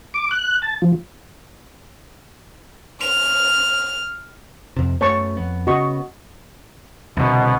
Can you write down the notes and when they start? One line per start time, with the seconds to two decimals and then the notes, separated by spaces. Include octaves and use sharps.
0.14 D6
0.31 F#6
0.62 A5
0.82 F3
3.01 F6 F7
4.77 F2 C3
5.01 F#2 A3 B3 C#5 A5 C#6
5.37 F2 B3
5.67 C#3 B3 F#4 D#5 C#6
7.17 C2 B2 D3